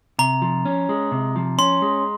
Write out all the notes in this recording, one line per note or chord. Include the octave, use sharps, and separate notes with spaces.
C3 A#5
F3
C#4
G#3
C3
F3
C#4 C6
G#3